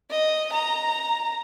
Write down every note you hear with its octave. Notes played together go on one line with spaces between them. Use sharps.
D#5
A#5